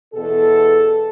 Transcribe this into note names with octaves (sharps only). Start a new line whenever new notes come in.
E2 B2 A4